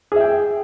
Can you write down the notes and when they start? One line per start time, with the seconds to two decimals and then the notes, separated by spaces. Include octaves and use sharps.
0.12 G#4
0.16 E5
0.21 G5